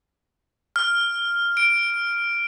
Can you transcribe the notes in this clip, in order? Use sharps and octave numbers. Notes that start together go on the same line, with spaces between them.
F6
D7